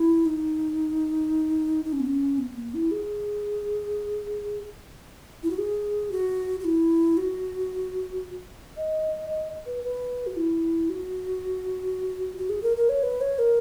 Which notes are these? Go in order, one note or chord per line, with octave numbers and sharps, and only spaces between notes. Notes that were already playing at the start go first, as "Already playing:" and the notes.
Already playing: E4
D#4
D#4
C#4
B3
C#4
B3
B3
A#3
E4
G#4
E4
F#4
G#4
F#4
F#4
E4
F#4
D#5
D#5
B4
B4
F#4
E4
F#4
F#4
G#4
A#4
A#4
C#5
B4
C#5
A#4